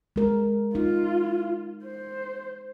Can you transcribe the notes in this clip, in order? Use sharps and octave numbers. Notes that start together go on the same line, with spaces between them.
G#3 A#4
D#4 F4
C5